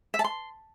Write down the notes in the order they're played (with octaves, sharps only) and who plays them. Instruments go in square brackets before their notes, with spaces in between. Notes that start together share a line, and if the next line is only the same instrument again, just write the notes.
[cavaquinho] E5
A5
C6